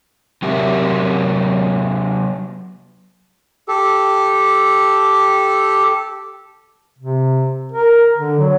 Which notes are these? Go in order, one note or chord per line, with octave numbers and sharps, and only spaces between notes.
C3 F#3 G4 A#4 E5
G4 A4
C3
A#4
D3
F#3